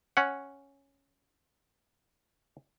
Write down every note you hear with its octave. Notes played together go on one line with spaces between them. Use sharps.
C#4 F#5